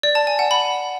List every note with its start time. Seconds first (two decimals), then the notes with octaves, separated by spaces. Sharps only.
0.03 D5
0.15 A5
0.27 G#5
0.39 F#5
0.51 B5